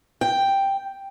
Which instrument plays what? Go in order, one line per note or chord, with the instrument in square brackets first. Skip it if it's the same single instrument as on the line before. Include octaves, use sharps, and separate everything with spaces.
[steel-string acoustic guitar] G5